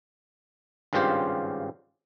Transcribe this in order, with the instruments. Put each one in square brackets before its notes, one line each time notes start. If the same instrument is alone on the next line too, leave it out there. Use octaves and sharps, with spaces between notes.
[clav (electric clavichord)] G#1 G2 C#3 F4 G4 C5